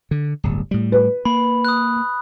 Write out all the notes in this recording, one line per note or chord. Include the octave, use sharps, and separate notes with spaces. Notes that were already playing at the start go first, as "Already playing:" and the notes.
D3
D1 G1
A2 G3
B4
A#3 B5
D#6 F#6